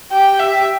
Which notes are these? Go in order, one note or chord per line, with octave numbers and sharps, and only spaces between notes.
G4 G5
E5
G5